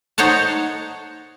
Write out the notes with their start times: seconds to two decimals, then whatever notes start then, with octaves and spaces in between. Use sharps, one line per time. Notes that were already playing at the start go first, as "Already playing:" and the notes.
0.18 D#4 C5 C#5 F#5 A5